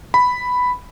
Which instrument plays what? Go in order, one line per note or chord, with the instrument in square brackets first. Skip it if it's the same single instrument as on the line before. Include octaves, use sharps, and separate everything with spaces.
[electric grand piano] B5